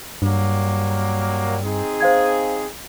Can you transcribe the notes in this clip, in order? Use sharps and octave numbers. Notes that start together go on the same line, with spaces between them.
G2 F#3 G3 A#3
C4 D#4 G#4
C5 F5 G#6